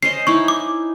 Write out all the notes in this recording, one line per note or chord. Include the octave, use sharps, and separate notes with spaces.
C#4 C5 D#5 C7
D#4 E4 C#6
D6